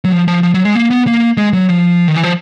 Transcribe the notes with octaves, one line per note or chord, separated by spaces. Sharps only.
F#3
F3
F3
F3
F#3
G#3
A#3
B3
A#3
G#3
F#3
F3
D#3
E3
F3